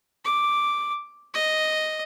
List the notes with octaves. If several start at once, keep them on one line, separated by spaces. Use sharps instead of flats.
D6
D#5